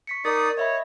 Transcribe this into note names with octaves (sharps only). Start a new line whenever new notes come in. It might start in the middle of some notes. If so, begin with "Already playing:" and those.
C#6 B6 C#7
D#4 A#4 D5 D#6 A6
C#5 D#5 E5 B5